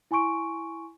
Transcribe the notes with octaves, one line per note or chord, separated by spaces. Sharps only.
E4 G#5 C6 C#6 D7